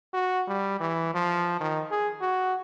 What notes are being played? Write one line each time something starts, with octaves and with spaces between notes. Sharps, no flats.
F#4
G3
E3
F3
D#3
G#4
F#4